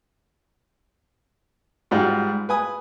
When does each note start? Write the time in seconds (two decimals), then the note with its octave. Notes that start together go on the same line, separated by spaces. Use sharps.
1.91 G#2 G3 F4 F#4
2.49 B4 G#5 D#6